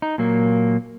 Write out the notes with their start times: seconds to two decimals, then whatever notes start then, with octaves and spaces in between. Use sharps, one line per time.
0.02 D#4
0.18 A#2 F#3 A#3